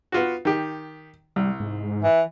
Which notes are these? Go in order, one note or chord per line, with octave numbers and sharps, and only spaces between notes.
B3 F4 F#4
D#3 G4
C2 G3
G#2
E3